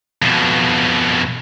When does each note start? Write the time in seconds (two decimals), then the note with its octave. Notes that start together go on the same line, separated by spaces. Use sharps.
0.22 F2 B2